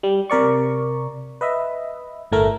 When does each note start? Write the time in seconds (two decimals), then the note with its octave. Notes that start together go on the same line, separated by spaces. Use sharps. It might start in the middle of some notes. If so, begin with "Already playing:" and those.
0.03 G3
0.30 C3 A#4 D5 C#6
1.41 B4 D#5 E5
2.32 G1 A2 A3 A#4